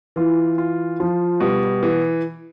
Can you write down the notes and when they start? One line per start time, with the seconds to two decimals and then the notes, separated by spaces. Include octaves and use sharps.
0.16 E3 F4
0.58 F4
1.00 F3 F4
1.40 B2 G3
1.83 E3